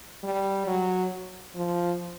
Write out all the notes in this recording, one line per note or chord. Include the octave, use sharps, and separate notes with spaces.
G3
F#3
F3